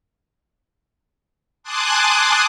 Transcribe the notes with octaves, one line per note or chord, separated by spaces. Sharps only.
G#5 A5 C6 D6 D#6 F#6